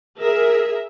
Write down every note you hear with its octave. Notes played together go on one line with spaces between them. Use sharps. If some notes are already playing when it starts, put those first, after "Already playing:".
G#4 A#4 E5